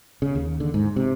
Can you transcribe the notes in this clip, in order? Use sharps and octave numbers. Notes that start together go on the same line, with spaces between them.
C#3
D#2
D3
G#2
C3